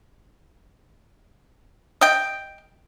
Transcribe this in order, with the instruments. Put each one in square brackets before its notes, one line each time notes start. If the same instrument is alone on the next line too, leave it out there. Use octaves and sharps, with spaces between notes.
[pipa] D#5 G5